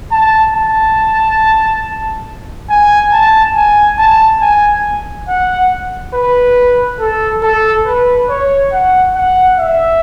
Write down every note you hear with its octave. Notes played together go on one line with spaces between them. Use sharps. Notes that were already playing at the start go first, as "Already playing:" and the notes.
A5
A5
G#5
A5
G#5
A5
G#5
F#5
B4
A4
A4
B4
C#5
F#5
F#5
E5